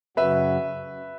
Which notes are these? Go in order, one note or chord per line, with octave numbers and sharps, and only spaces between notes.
F#2 C#3 F#3 C#4 F#4 B4 E5